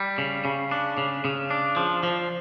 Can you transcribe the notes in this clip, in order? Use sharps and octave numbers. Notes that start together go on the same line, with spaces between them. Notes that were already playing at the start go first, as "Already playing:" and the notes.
Already playing: G3
C#3
C#3
D4
C#3
C#3
D4
F3
F3